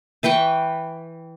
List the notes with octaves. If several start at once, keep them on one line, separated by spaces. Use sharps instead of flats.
E3 B4 G5 C#6